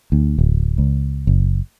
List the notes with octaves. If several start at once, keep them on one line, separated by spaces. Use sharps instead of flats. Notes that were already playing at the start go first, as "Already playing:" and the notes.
D2
D1
C#2
F#1